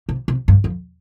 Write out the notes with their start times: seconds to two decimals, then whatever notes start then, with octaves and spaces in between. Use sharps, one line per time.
0.09 C3
0.28 C3
0.48 G2
0.64 F2